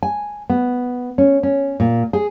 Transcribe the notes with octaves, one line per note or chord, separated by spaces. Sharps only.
G#5
B3
C#4
C#4
A#2
G#4